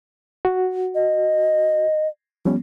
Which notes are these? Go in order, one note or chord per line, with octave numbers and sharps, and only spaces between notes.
F#4
D#5
F3 G3 B3 C#4